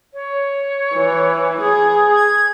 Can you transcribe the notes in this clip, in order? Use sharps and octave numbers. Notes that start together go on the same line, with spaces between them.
C#5
E3
G#4
G#6